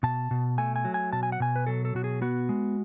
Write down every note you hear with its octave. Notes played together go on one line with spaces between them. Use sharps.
B2 A5
B2
A3 G#5
G#5
F#3
G#5
B2 A5
G#5
F#5
B2 G#5
B4
F#3 A4
A4
B2 F#4
G#4
B3 F#4
G#3